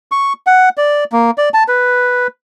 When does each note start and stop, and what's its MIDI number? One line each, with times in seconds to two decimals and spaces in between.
0.11 0.33 85
0.47 0.69 78
0.77 1.04 74
1.12 1.31 58
1.38 1.49 74
1.54 1.64 81
1.68 2.27 71